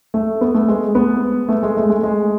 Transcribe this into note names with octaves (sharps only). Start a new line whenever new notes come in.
A3
B3
A3
G#3
B3
A3
G#3
A3
G#3
G#3